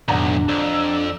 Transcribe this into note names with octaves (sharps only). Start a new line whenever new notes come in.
B1 F2 A2 D#3 D4 F#5 A#5
F2 D5 E6